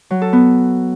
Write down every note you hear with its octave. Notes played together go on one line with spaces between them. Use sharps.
F#3
A4
B3